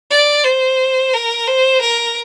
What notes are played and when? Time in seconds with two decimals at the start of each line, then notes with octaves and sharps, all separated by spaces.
0.11 D5
0.44 C5
1.13 A#4
1.48 C5
1.81 A#4